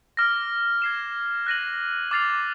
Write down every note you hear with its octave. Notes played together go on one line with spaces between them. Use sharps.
D6 F6 A#6
G#6 C7 E7
F#6 A#6 D#7 F#7
D6 F6 A6 C7 F7